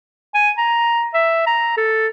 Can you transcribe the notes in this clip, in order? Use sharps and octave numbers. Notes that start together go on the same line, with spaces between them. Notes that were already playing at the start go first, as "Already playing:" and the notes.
G#5
A#5
E5
A#5
A4